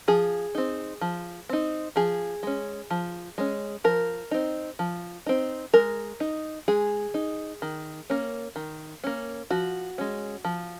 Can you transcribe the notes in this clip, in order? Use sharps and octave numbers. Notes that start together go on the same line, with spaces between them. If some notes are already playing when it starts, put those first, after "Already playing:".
F3 G#4
C4 D#4
F3
C4 D#4
F3 G#4
G#3 C#4
F3
G#3 C#4
F3 A#4
C4 D#4
F3
C4 D#4
G#3 A#4
D#4
G#3 G#4
D#4
D#3
A#3 C#4
D#3
A#3 C#4
F3 F#4
G#3 C#4
F3